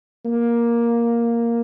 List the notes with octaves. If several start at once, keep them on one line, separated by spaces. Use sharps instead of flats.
A#3